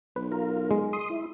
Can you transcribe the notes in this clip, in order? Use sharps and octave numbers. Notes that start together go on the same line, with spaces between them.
B1 B4
F4 A#4
G#3
C6 D#6
E4